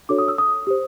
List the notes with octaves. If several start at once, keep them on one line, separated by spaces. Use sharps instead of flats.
D4 F#4 A4 C#5 D6
D#6
E6
D#6
G4 C5